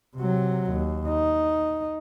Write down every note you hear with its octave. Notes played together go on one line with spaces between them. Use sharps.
C3 F#3
D#2
D#4